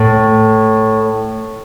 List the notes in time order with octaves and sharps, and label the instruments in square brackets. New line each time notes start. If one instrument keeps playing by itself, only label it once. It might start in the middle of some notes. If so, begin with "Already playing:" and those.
Already playing: [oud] A2